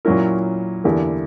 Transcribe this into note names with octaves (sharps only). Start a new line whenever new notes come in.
A#2 F#3 C#4 E4 A#4
E2 D3 A#3 E4 G4